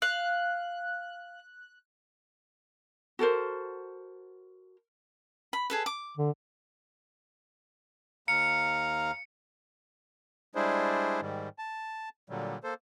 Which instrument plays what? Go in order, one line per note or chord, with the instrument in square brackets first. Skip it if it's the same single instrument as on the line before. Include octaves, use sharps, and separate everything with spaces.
[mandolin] F5 [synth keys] F#6
[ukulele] F#4 A4 A#4 C5
[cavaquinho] B5
G#4 A4 B4
D6
[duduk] D3
[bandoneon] D#2 F5 A#5 [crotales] C#7
[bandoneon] G3 G#3 D4 E4 G#4 C5
G#2 D#3 G3
A5
A#2 D3 F#3 G3
A#3 A4 C5